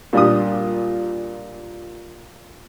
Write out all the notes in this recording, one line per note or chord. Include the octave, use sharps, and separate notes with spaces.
A#2 G3 D4 F4 G4 D#6